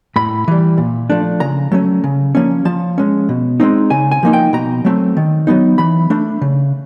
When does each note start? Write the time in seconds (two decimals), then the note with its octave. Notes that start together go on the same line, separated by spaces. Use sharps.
0.16 A2 B5
0.48 E3 G3
0.78 A#2
1.10 F3 A3 D4
1.40 C#3 A#5
1.72 F#3 A3 C#4
2.04 C#3
2.35 F3 A#3 C#4
2.65 F3 A5
2.98 G#3 C#4
3.29 B2
3.60 G#3 C4 D#4
3.90 C#3 G#5
4.11 G#5
4.23 F3 A#3 D#4
4.33 G5
4.53 B2 A#5
4.85 F#3 A3 C4
5.17 D#3
5.47 F#3 B3 D#4
5.78 E3 B5
6.10 A3 D4
6.41 C#3